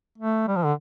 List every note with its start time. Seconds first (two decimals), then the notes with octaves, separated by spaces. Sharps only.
0.18 A3
0.48 G3
0.56 F3
0.65 D3